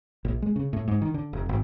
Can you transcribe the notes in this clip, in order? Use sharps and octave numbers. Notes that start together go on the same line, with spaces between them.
A#1
G#3
C#3
A2
G#2
D#3
D3
F1
G#1